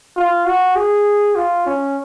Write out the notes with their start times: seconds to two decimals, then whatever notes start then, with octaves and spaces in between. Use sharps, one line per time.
0.16 F4
0.46 F#4
0.76 G#4
1.35 F4
1.66 C#4